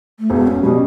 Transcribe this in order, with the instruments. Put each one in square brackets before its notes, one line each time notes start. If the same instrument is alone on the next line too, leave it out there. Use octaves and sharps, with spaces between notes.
[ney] A3
[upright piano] E1 [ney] B3
[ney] C#4
[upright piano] B2 G3 [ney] C#4